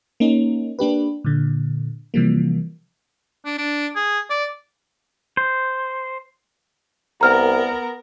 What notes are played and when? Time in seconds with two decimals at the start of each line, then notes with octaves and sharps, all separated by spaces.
0.20 A#3 C#4 D#4
0.79 A#3 D4 G4 B4
1.25 A#2 D3
2.14 C3 E3 F3 G3 A#3
3.46 D4
3.58 D4
3.96 G#4
4.30 D5
5.37 C5
7.21 C2 B3 A#4 A#5 F6